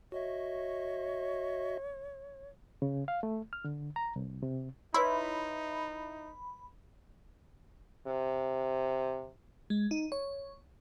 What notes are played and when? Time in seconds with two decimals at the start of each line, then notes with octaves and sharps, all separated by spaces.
0.12 F#4 C#5 D#5 E5
2.82 C#3
3.08 F5
3.23 A3
3.53 F6
3.65 D3
3.96 A#5
4.16 C2
4.43 C3
4.94 D#4 E4 B4 C#5 B5 C6
8.07 C3
9.70 G#3
9.91 D#4
10.12 C#5